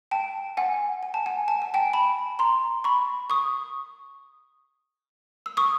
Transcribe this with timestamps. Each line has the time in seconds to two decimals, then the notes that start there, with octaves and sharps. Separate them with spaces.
0.11 G5 A5
0.57 F#5 G#5
1.03 G#5
1.14 A5
1.26 F#5 G#5
1.48 A5
1.62 G#5
1.74 G5 A5
1.93 A5 B5
2.39 A#5 C6
2.84 B5 C#6
3.30 C#6 D#6
5.46 E6
5.57 C#6 D#6